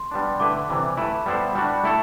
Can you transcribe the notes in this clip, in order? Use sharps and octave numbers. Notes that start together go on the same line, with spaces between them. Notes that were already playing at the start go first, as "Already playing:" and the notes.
Already playing: C6
G3 B3 D4
D3 A3 E4 B4 D6
C3 E3 G3
A3 E4 B4 B5
G3 B3 E4 A4 C5
G3 D4 F#4 B5
A3 E4 A4